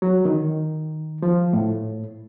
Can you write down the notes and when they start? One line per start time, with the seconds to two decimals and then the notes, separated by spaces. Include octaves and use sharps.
0.02 F#3
0.25 D#3
1.22 F3
1.53 A2